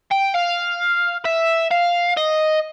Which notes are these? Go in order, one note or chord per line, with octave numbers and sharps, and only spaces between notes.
G5
F5
E5
F5
D#5